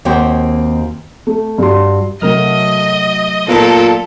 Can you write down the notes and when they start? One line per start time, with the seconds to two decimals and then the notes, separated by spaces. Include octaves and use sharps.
0.05 D#2 A#3 C4 F#4 G5
1.27 A3
1.58 G2 F#4 C6
2.22 C3 F#3 A3 A#4 D#5 F6
3.49 A#2 B3 F4 A4